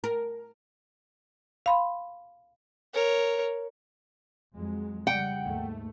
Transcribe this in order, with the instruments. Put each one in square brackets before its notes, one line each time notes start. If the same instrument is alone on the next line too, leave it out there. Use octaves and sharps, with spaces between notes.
[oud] A#4
[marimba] F5 B5 C6
[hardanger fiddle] A#4 C#5
[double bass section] F2 F#3 G#3
[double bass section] C#3 G3 [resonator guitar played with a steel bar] F#5 G5
[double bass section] D#2 G#2 A3